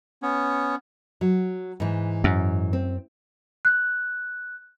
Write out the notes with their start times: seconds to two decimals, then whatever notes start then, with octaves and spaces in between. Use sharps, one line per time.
0.22 B3 C#4
1.21 F#3
1.80 G#2 E3
2.24 F#2
2.73 C4
3.65 F#6